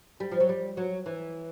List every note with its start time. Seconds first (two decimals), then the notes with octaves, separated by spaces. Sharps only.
0.20 G3
0.32 F3
0.40 F#3
0.49 G3
0.77 F#3
1.06 E3